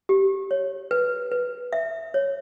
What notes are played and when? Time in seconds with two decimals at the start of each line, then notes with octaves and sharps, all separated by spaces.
0.09 G4
0.51 C#5
0.91 B4
1.32 B4
1.73 E5
2.14 C#5